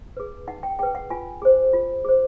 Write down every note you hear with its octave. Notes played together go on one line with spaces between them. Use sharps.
G#4 B4
D#4 F#5
G5
G#4 B4 G5
F#5
F4 G#5
G#4 C5
F4
G#4 C5